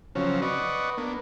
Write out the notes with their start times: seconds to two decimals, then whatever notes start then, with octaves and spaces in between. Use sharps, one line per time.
0.15 C#3 F3 F#3 C4 C#4
0.42 B4 D5 D#5 F#5 C#6
0.98 A#3 B3 D4